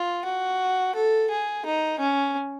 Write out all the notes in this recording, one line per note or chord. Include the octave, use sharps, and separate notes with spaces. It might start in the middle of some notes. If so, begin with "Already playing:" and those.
Already playing: F4
F#4
A4
G#4
D#4
C#4